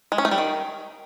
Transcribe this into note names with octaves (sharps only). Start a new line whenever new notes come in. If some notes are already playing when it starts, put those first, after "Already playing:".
G#3
C#4
A3
G3
D#3